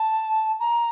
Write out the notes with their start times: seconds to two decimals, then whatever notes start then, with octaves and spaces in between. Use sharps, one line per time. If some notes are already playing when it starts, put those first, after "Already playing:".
Already playing: A5
0.60 A#5